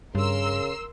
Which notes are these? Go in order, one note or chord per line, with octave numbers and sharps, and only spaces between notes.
G2 C#3 A#4 C6 E6